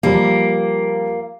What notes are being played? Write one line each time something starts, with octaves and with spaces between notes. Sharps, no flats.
F3 G3 A#3